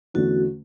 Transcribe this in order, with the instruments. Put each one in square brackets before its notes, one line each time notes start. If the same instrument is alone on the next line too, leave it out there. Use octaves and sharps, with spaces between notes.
[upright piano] E2 D3 A3 C#4 [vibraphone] F#4